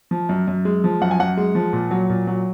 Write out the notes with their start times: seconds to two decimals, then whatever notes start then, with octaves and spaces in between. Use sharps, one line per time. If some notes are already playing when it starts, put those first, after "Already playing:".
0.11 F3
0.29 F#2
0.47 F#2
0.65 G#3
0.84 F3
1.01 F#2 F#5
1.11 G#5
1.19 F#2 F#5
1.37 G#3
1.55 F3
1.73 A#2
1.91 F#3
2.10 A#2
2.27 F#3